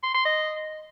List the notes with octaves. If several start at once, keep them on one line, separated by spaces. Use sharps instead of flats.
C6
C6
D#5